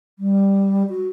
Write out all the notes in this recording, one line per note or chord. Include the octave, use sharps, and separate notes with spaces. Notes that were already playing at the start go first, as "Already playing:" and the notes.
G3
F#4